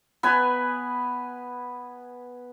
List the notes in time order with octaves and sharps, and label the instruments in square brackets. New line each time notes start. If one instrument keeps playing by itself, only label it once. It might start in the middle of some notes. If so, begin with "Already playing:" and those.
[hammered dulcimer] B3 B4 G#5